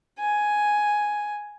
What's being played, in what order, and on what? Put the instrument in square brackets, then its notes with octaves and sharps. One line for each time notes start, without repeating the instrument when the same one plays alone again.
[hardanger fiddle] G#5